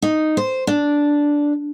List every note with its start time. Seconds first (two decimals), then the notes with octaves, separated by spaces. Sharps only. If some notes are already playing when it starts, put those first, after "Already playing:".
0.02 D#4
0.37 C5
0.67 D4